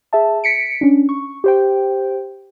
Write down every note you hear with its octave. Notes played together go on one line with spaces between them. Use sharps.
G#4 E5 A5
B6 C#7 D7
C#4 D4
C#6
G4 C5 G5